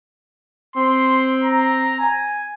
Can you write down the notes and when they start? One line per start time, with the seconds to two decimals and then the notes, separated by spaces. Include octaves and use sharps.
0.76 C4 C6
1.44 A#5
2.00 G#5